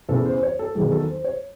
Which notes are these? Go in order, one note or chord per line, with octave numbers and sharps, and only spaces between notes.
E2 C#3 E3 A4
C5
C#5
A4
E2 D#3 F#3 G#4
A4
C5
C#5